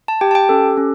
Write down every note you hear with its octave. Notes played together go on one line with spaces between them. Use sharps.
A5
G4 G5
A5
G5
C#4 A4
C#4